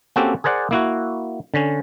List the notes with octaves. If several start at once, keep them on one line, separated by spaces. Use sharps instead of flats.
A#3 C4 C#4 F#4 G4 A4
G#4 A#4 C5 D5 F#5
A#3 E4 F#4
D3 C#4